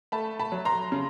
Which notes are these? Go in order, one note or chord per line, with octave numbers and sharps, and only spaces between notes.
A3 A5 B5
A5 B5
F#3
A#5 C6
C#3